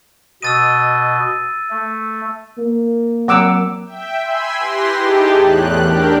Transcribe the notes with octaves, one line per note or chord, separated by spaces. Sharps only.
B2 D#5 E6 A6 D#7
A3
A#3
F#3 C4 F#5 A#5 D6 E6
E5 G5
G#5 B5 C6 E6
E4 G4 B4 C6 A#6
D#4 G4 G#4 A5
E2 A2 F#6
D4 G4 A#4